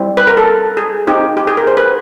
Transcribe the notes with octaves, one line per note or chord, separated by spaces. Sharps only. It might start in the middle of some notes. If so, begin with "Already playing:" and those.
Already playing: G3 C4 E4
B4
A#4
A4
G#4
C4 D#4 G4
G4
G#4
A#4
C5
B4